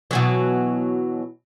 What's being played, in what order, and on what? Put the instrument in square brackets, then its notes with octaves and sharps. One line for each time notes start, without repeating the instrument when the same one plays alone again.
[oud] B2 E3 F#3